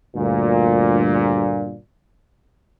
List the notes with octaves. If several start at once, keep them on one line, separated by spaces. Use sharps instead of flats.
D2 G2 A#2